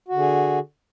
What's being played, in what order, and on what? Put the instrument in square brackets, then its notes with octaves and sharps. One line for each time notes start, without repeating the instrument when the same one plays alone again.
[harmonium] F#4
D3
G#4